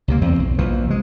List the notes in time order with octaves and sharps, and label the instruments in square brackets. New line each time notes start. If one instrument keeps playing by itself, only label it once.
[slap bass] C#2 C3 A#3
E2 C4
B1
A#1 E3 F3
C3 G#3